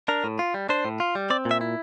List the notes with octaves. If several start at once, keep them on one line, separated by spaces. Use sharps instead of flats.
D4 A#4
A2
F4
G3
D4 C5
A2
F4
G3
C4 D5
A#2
E5
E4